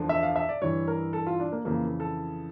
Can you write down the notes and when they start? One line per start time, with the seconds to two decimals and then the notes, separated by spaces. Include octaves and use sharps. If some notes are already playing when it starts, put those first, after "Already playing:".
Already playing: E2 D3 F3
0.09 E5
0.23 F5
0.36 E5
0.49 D5
0.61 G2 E3 C#5
0.88 A#4
1.13 A4
1.26 F4
1.40 D4
1.52 A#3
1.65 F2 C#3 E3 A#3
2.00 A4